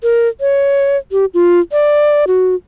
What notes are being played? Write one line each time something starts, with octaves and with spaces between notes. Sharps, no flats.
A#4
C#5
G4
F4
D5
F#4